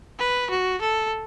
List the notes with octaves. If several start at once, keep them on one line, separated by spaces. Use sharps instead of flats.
B4
F#4
A4